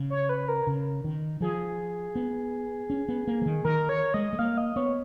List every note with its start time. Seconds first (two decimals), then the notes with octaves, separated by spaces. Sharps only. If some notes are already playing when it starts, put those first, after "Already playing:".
Already playing: C#3
0.10 C#5
0.29 B4
0.48 A#4
0.67 C#3
1.04 D#3
1.41 F3 G#4
2.15 B3
2.90 C#4
3.09 B3
3.27 A#3
3.42 F3
3.46 D#3
3.64 D#3 A#4
3.89 C#5
4.14 G#3 D#5
4.33 G#3
4.39 A#3 F5
4.57 D#5
4.76 B3 C#5